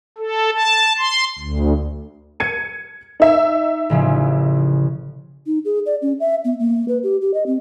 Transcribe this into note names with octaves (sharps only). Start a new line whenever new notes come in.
A4
A5
C6
D2
G#6 C#7 D#7
D#4 E5
A1 C#3 F3
D#4
G#4
D5
C#4
E5
B3
A#3
B4
G4
G4
D#5
C4